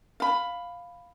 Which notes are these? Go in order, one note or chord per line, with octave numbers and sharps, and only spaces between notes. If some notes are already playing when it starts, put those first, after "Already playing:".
F5 B5